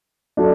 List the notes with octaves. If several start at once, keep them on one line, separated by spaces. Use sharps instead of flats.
F#3 A3 D4